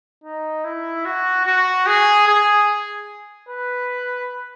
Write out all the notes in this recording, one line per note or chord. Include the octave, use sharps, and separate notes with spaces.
D#4
E4
F#4
F#4
G#4
G#4
B4